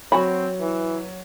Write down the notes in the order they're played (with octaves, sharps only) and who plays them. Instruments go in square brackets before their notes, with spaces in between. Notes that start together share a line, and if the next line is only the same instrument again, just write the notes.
[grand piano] F#3 [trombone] C4 [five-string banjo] F#4 B5
[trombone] E3